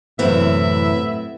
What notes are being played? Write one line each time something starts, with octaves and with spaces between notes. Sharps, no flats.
F#2 A2 C3 E3 B3 C4 E4 E5